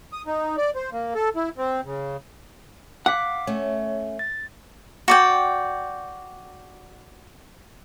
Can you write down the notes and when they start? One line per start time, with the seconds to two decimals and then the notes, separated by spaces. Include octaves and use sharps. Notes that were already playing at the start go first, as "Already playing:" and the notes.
0.13 D#6
0.27 D#4
0.57 D5
0.75 C5
0.92 A#3
1.15 A4
1.36 E4
1.58 C4
1.85 C#3
3.06 F5 F#5 D6 B6
3.47 A3 C#4 C#5
4.19 A6
5.08 F#4 D5 G5